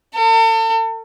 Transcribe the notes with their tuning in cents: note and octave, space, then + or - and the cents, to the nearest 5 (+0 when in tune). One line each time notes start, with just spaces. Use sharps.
A4 +40